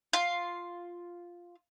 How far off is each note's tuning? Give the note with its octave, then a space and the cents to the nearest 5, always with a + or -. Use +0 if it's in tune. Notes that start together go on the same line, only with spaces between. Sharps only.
F4 +0 F5 +0